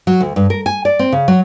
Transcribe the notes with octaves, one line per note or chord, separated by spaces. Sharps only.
F#3
D2
G2
A#4
G#5
D5
C4
C#3
F#3